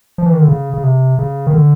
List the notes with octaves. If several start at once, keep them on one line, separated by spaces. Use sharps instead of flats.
F3
E3
D#3
D3
C#3
C#3
C3
C#3
D#3
D3